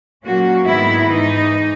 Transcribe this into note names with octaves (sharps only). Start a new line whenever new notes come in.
A#2 F#3 A#3 C#4 F#4
G#2 D#3 G#3 B3 E4
G#2 E3 G#3 D#4